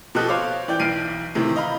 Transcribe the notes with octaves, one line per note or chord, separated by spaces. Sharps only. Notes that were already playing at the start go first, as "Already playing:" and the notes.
B2 F3 G4 A4 D#5 F#6
C5 C#5 F5 D6
E3 D5 G5 G6
B1 E3 F6 C7 D7 D#7
A2 C3 D#3 E3
D#5 F5 A#5 B5